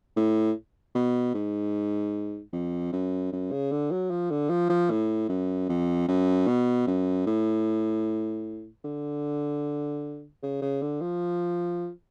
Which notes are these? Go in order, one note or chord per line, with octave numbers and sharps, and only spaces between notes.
A2
B2
G#2
F2
F#2
F#2
C#3
D3
F#3
F3
D3
F3
F3
A2
F#2
F2
F#2
B2
F#2
A2
D3
C#3
C#3
D3
F3